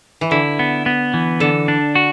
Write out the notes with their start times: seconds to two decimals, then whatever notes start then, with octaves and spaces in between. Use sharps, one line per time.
0.21 E3
0.31 D3 E4
0.59 B3
0.86 B3
1.14 E3
1.40 D3 A4
1.68 D4
1.95 F#4